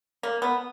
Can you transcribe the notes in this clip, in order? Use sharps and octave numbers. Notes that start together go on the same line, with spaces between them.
A#3
B3